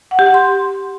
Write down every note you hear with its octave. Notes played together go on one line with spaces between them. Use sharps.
F#5
G4
F#5
C6